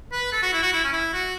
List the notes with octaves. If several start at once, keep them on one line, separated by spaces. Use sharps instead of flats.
B4
A4
F#4
E4
F#4
E4
C#4
E4
F#4